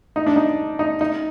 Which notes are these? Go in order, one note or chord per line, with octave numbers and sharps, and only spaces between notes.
D#4
D4
D#4
D#4
D#4